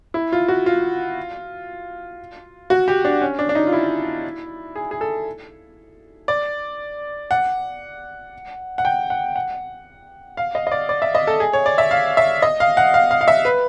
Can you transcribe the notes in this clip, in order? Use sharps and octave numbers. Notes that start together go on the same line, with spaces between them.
E4
F4
F#4
F4
F#4
G4
D4
C#4
D4
D4
D#4
F4
E4
G#4
G#4
A4
D5
F#5
F#5
G5
F#5
F#5
F5
D#5
D#5
D5
D5
E5
D#5
A4
G#4
C#5
D5
E5
F5
E5
D#5
F5
F#5
F5
F5
F5
E5
B4